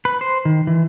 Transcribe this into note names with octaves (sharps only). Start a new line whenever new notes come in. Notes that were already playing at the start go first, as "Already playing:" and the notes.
B4
C5
D#3
E3